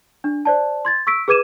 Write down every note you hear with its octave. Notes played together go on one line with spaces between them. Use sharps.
D4
C5 D5 A5
C6 G#6 A6
C#6 E6 B6 D7
G#4 B4 D6 G#6 D#7 E7